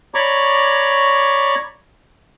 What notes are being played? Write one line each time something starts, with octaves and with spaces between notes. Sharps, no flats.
C#5 D5 A#5 B5 C#6 D6